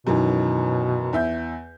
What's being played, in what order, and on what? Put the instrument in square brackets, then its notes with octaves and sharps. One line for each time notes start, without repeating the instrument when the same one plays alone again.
[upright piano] F#2 D#3 E3 [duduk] B2
[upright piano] E2 E5 G6